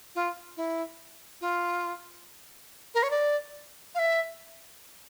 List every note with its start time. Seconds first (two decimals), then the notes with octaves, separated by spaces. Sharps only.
0.15 F4
0.57 E4
1.41 F4
2.94 A#4
3.03 C#5
3.10 D5
3.95 F5
3.99 E5